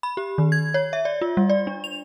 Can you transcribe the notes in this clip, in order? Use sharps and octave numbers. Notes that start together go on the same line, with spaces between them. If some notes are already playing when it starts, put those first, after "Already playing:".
B5
G4
D#3
G#6
C#5
E5
D5
F4
G3
D5
D4
F7